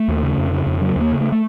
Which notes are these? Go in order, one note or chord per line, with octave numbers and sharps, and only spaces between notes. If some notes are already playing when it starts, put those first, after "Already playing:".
Already playing: A3
D#2
C#3
F2
C#3
F2
C#3 F#3
D#2 A#3
C#3
A3
A3